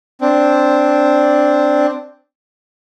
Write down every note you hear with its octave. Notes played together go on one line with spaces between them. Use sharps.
C4 D4